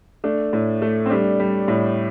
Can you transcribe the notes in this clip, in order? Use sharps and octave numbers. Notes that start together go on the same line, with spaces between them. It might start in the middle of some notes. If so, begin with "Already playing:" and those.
A3 D4
A2
A3
C4
G3 D4
G3
A2